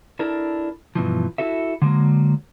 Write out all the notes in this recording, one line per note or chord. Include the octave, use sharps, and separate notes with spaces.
D4 E4 A4 A#4
G2 B2 E3 F3
E4 F#4 A4 E5
D3 F#3 G#3 A#3